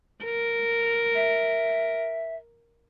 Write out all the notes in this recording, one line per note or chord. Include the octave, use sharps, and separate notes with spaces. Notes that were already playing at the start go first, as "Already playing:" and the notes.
A#4
E5